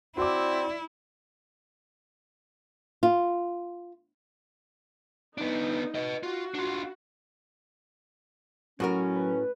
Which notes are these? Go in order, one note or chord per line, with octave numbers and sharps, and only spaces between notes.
C4 E4 F#4 D5 D6
F4
B3 D4 D#4
B4 D#5
F4 F#4
D4 F4
A2 F#3 C#4 F#4 A#4
B4